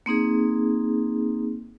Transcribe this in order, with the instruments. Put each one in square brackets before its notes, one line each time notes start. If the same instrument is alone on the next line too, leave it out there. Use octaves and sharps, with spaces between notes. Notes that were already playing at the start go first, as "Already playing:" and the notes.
[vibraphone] A#3 C4 D#4 G#4